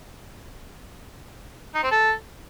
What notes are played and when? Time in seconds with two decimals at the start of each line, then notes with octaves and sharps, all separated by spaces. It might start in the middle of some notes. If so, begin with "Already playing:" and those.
1.75 D#4
1.83 C4
1.91 A4